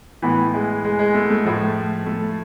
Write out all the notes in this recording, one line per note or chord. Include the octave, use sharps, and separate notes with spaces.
A2 E3 B3
G#3
G#3
G#3
A3
A3
A2 F3
A3